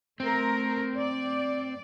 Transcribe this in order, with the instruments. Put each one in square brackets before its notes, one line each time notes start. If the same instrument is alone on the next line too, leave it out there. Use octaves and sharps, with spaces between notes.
[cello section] A3 A#4 [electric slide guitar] C4
[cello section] D5